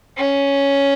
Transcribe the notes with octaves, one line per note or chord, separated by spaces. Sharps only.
C#4